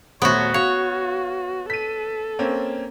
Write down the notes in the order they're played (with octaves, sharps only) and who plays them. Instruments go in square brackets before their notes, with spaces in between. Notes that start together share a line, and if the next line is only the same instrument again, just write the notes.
[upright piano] D#1 A3 C5 [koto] B3 F#4 [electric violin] C#5
[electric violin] F#4 [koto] C#5 [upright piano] F5
[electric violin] A4 [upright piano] B6 D#7
[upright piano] A#3 C4 C#4